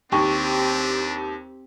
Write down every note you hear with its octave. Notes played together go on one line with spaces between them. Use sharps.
D#2 C4 D4 G4 G5 C#6